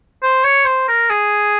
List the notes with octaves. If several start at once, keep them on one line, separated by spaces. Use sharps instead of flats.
C5
C#5
C5
A#4
G#4